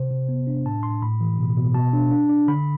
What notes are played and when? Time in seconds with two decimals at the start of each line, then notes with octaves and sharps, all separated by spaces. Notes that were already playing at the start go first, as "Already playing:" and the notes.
Already playing: C3 C5
0.11 C3
0.29 B3
0.47 D4
0.65 A2 A5
0.83 A2 C6
1.02 A2 B5
1.21 E3
1.38 B2
1.57 B2
1.74 B2 A5
1.93 D4
2.11 D4
2.29 D4
2.48 D3 B5